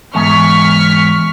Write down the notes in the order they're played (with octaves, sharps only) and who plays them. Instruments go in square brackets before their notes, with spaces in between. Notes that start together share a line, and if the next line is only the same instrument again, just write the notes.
[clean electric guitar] E2 G#2 [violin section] C#6 F6 B6